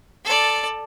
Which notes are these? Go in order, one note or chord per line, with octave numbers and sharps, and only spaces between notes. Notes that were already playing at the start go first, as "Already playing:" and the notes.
A4 D5